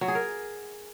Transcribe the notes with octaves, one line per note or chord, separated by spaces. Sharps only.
F#3
G#4
A#4